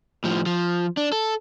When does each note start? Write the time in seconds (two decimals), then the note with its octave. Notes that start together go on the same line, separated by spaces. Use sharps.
0.24 A2 F3
0.46 F3
0.97 D4
1.12 A4